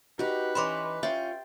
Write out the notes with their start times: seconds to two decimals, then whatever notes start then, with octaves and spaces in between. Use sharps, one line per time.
0.19 D#4 F#4 G4 B4
0.55 E3 C#4 D#4 B5 C6 D6
1.03 C#4 F4 E5 G5 C6